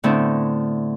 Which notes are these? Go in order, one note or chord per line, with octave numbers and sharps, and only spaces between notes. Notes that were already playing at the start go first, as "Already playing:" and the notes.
A2 D3 A3 B3 C4 E4